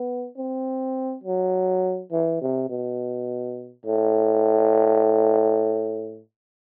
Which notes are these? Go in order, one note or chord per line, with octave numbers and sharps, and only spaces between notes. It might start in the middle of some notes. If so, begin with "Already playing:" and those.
Already playing: B3
C4
F#3
E3
C3
B2
A2